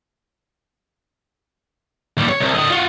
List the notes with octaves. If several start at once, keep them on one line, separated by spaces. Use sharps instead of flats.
D#2 G3
C#5
C2
D3 D#5
F4 F#4